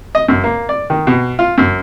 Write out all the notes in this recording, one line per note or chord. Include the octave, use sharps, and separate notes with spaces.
D#5
F#2
A#3
D5
D#3
B2
F4
F#2